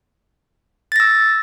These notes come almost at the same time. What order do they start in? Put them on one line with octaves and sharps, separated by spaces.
A6 A#6 E6